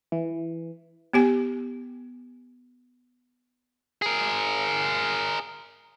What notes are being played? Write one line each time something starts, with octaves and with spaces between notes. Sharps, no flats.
E3
B3 G4 G#5
G#4 A#4